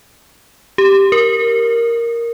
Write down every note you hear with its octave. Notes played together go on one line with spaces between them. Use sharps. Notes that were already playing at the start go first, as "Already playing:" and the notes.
G4
A#4